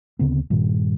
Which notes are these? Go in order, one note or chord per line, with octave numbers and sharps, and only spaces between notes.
D2 C#3 B3 C4
G2 A#2 D#3